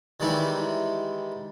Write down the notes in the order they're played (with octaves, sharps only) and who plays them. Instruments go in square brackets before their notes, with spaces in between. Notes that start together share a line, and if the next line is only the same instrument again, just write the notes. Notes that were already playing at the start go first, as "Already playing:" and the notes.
[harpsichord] D#3 E3 G3 G#3 D#4 E4